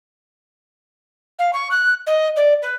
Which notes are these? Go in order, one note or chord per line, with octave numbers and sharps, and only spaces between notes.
F5
C#6
F#6
D#5
D5
B4